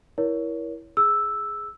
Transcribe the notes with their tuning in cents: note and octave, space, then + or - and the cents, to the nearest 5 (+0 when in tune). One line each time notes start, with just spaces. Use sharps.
E4 +0 A#4 +30 C#5 +25
G#4 +0 E6 +0